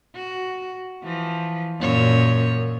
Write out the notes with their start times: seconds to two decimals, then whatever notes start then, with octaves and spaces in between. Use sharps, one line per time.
0.15 F#4
1.04 E3 F3
1.80 F#2 A#2 C#5